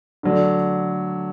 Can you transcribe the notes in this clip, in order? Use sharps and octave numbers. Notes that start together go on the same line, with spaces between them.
D3 F#3 A3 D4